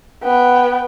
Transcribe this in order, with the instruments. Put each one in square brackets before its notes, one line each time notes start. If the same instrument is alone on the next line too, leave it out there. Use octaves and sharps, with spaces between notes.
[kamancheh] B3 G5